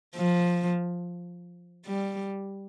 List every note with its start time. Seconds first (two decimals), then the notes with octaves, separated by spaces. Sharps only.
0.16 F3
1.87 G3